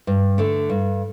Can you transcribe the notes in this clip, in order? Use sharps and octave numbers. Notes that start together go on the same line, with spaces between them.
G2
D3 A3
G2